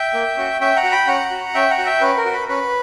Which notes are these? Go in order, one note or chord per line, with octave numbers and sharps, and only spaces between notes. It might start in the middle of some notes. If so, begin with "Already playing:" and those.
Already playing: E5 G5
A#3
C#4 F#4
C#4 E5 G5
F#5 A#5
F#4
G5 B5
C#4 F#5 A#5
F#4
C#4 E5 G5
F#5 A#5
F#4
E5 G5
C#4 B4
A#4
F#4
B4
C#4 B4